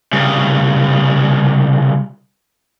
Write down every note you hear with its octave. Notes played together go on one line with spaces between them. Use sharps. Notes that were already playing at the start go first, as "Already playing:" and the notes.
C2 C#3